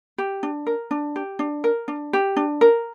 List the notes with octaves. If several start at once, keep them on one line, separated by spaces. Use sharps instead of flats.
G4
D4
A#4
D4
G4
D4
A#4
D4
G4
D4
A#4